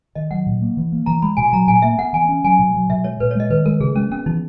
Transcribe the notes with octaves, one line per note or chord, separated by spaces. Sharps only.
D#3 D#5
F#3 F#5
A#2
A#3
E3
A#3
E3 A#5
G#3 B5
B2 G#5
F#3 A#5
A#2 G#5
A#3 E5
B3 F#5
E3 G#5
C#4
F#3 G#5
B2
F#3
B2 E5
G#3 C#5
A#2 B4
C#5
G#3 D#5
D#3 B4
G#3 A#4
C#3 G#4
G#3 C#4
B3 C#4
E3 D#4